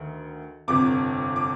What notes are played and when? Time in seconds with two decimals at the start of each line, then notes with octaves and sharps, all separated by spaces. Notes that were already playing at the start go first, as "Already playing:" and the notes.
Already playing: D2 D#3
0.68 G1 F2 C3 D6
1.36 D6